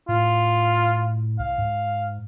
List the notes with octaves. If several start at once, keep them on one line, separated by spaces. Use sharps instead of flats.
A2 F4
C2 F5
G#2